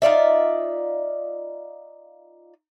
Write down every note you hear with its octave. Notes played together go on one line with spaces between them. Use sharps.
D#4 F4 D5 E5